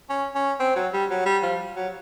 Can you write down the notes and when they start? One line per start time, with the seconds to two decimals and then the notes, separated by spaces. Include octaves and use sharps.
0.09 C#4
0.35 C#4
0.60 C4
0.76 F#3
0.93 G3
1.10 F#3
1.26 G3
1.43 F3
1.76 F#3